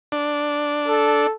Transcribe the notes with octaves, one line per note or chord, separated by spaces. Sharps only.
D4
A4